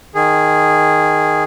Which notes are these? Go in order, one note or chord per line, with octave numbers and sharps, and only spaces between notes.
D#3 G#4